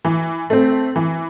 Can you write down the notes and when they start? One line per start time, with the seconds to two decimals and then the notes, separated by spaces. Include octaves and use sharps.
0.05 E3
0.50 A3 C4
0.96 E3